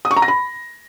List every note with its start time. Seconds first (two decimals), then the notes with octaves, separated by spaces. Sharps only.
0.05 D#6
0.11 C#6
0.16 A#5
0.22 A#6
0.28 B5